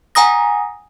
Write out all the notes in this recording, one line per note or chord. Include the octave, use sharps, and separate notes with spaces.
F#5 G#5 A#5 D#6 A#6